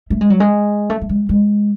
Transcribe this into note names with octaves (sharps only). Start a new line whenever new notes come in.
A3
G#3
F#3
G#3
A3
A3
G#3
G#3